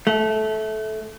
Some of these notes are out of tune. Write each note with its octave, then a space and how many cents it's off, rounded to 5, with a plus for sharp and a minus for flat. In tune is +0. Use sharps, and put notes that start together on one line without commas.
A3 -20